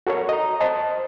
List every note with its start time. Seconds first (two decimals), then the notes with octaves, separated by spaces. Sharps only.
0.07 F#4 A4 A#4 C#5
0.29 D#5 A#5
0.61 C5 D#5 A5